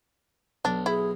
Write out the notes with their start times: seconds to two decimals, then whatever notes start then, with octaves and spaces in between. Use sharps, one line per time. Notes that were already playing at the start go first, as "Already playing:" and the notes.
0.65 B1 D4
0.86 E4 G#4